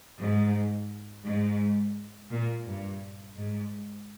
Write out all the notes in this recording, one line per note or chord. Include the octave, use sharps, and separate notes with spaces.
G#2
G#2
A#2
G2
G#2